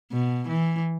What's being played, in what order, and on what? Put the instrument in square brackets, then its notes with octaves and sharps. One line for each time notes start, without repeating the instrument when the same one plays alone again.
[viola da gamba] B2
E3